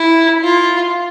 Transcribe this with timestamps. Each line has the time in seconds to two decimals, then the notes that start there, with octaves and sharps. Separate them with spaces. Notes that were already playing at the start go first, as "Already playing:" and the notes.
Already playing: E4
0.44 F4